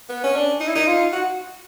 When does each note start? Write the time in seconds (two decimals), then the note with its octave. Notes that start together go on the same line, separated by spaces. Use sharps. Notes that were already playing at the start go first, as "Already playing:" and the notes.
0.09 B3
0.24 C#4
0.36 D4
0.60 D#4
0.68 E4
0.76 D#4
0.87 F4
1.12 F#4